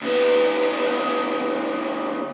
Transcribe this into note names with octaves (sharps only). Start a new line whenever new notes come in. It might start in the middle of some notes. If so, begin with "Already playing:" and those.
D2 B3